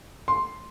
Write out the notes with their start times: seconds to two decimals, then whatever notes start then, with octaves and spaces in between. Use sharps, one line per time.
0.28 C6